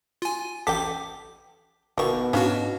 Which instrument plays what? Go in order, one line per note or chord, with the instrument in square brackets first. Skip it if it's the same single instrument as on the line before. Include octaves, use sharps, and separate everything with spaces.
[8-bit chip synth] F4 G#5
[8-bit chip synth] A1 D6 B6 [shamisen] A4 G5
[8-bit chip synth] G1 C#6 [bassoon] B2 [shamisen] D#3 F3 A#3
[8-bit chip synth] G#2 D4 F#4 [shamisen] C#4 F5